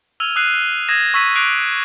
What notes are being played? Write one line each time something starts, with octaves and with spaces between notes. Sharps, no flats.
E6 F6 G#6 D#7 F7
D#6 E6 F#6 C7 D#7
D#6 G#6 A#6 E7
C#6 E6 B6 D#7
D6 F#6 C7 D7 F7